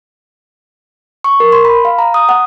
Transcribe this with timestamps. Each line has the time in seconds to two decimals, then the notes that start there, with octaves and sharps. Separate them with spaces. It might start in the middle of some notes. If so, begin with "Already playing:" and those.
1.24 C#6
1.40 A#4
1.52 C6
1.65 B5
1.85 F5
1.98 A#5
2.14 D#6
2.29 F#5